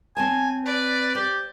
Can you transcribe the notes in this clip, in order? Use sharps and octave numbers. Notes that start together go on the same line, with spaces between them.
C4 C#5 G#5 A5
B4 D5
G4 C5